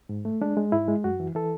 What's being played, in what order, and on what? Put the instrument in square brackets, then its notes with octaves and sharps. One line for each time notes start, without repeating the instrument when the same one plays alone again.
[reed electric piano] G#2
A3
G#3 D4
G#3
G#2 E4
G#3
F#2 F#4
E3
E3 A4